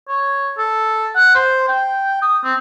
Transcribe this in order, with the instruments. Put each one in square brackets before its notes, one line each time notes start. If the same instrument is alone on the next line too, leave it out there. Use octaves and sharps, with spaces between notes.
[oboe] C#5
A4
F#5
C5
G5
D#6
C4